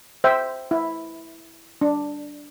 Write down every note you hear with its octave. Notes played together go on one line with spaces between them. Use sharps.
C5 E5 G5
E4
D4